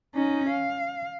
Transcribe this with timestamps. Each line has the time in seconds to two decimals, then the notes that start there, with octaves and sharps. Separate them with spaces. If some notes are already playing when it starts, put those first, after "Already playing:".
0.15 C#4 D#4
0.50 F5